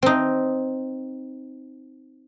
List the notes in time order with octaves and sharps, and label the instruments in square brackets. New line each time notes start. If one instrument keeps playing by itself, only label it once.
[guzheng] C4 D#4